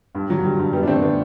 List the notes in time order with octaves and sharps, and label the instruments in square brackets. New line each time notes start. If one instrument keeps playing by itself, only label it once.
[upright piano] G2
D3 F#3
D3 G3
G2 G3
F#2 G3 B3
D4
D3 A3 C4
D3 B3 D4